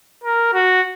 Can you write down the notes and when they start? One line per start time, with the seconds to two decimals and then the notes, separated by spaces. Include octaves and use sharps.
0.24 A#4
0.54 F#4